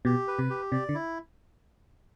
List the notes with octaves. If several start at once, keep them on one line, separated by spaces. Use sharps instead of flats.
B2 G4
B4
C3
G4
C3 D5
D3
E4